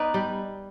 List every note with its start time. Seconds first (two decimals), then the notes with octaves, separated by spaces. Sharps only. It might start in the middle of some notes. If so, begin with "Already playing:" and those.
Already playing: B3 D#4 B4 D5
0.14 G3